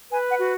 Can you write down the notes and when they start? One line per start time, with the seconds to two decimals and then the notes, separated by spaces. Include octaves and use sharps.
0.11 B4 G#5
0.30 F#5
0.40 F#4